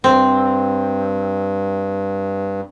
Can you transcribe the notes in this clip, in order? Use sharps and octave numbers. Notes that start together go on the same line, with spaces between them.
G2 C4